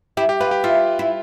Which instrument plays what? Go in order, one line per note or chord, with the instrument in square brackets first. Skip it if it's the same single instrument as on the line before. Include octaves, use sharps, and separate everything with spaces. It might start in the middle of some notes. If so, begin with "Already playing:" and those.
[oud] E4 [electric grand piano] G4
[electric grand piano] G4
[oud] F4 [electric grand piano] B4
[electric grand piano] G4
[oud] E4 [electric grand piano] F4
[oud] E4